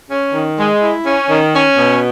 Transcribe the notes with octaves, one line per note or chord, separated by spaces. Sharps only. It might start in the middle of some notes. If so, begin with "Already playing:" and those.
C#4
D#3
G#3
E4
C#4
D#3
C#4
B2